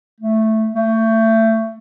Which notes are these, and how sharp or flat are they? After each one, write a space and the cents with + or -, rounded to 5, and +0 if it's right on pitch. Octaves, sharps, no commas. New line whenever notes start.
A3 +0
A3 +25